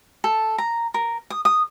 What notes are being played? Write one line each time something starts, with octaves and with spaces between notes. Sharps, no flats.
A4
A#5
A#4
D#6
D#6